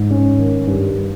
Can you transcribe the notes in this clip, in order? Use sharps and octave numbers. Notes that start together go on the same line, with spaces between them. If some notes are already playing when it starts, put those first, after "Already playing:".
Already playing: G#2
C#4
D#3
G2